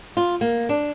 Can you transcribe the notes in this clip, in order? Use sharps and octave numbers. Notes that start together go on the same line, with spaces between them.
F4
A#3
D4